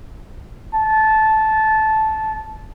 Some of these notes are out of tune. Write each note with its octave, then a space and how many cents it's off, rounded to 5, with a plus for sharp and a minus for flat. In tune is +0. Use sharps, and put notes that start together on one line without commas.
A5 -15